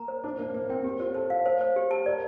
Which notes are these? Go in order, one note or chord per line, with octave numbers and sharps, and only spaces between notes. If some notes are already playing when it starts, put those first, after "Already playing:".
Already playing: A#3 A#5
C5
D4 C5
A#3 C5
A#3 C5
C4 G5
G4
F4 C5
A4 C5
F5
C5
C5
G4
A5
A#4 D5